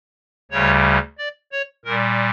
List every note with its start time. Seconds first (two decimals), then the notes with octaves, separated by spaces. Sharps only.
0.51 D2 C#3 G3 C#5
1.18 D5
1.52 C#5
1.85 A#2 G3 A#4